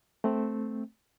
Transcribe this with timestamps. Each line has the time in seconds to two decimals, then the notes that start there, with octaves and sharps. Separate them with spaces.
0.24 A3 C4